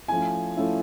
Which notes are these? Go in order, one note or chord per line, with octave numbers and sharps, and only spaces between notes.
F3 A3 C#4 E4 G#5
F3 A3 C#4 E4